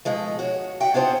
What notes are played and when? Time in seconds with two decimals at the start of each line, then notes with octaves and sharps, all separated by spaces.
0.05 B2 F3 G#3 A3
0.39 F#4 C#5
0.80 F#4 E5 F#5 G5
0.94 D4 F4 G#4 C5 F#5